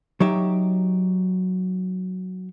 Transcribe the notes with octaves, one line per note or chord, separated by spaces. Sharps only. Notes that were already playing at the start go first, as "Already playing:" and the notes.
F#3 D#4 G4 E5